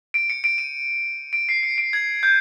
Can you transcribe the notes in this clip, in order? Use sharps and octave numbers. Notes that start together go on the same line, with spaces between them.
D7
C#7
D7
D#7
D7
C7
C#7
D7
G#6
G6